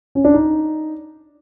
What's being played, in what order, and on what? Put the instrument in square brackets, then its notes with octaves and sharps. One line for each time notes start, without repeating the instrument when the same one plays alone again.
[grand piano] C#4
D4
D#4